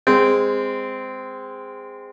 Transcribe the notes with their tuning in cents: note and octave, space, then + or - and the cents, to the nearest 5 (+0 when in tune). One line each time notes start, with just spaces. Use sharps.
G#3 -20 C4 -15